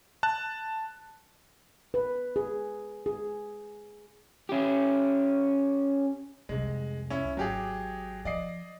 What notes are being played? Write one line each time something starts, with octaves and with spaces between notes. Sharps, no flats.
A5 F#6
B4
G#4
G#4
C#4 G4
C2 F2 G#3
C#4 E4
G#1 F#3 G4 G#4
F3 D5 D#5 C7